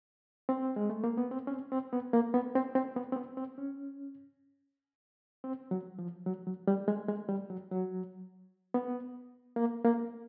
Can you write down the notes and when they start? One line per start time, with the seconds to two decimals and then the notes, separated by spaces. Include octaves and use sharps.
0.49 C4
0.76 G#3
0.90 A3
1.04 A#3
1.17 B3
1.31 C4
1.47 C#4
1.51 C4
1.72 C4
1.93 B3
2.13 A#3
2.34 B3
2.55 C4
2.75 C4
2.96 B3
3.12 C4
3.16 B3
3.37 C4
3.58 C#4
5.44 C4
5.71 F#3
5.99 F3
6.26 F#3
6.47 F#3
6.68 G3
6.88 G#3
7.08 G#3
7.29 G3
7.50 F#3
7.71 F#3
8.74 B3
9.56 A#3
9.84 A#3